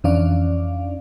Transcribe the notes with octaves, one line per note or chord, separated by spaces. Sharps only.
F2 E3 C#4 D4 D5 F5